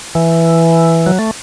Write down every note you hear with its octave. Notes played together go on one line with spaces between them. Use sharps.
E3
F#3
A3